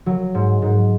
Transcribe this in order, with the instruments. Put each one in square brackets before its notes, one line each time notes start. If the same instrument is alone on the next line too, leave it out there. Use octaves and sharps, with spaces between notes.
[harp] F#3
G#2
G#2